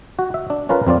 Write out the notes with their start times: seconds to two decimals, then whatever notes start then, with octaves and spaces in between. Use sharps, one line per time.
0.19 F#4
0.34 E5
0.50 D4
0.69 C#4 F4 A#4 B4 F5
0.87 F2 C4 F4 D5